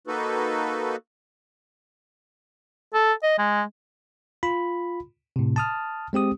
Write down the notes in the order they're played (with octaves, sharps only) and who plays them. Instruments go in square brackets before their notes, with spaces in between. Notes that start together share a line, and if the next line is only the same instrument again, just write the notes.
[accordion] A#3 D#4 F#4 A4 B4
[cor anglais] A4
D#5
G#3
[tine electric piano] F4 B5
A2 C3
A5 D#6 F6
G#3 C4 G4 D#6